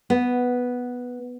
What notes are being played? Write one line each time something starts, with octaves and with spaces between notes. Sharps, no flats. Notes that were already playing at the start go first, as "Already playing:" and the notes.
B3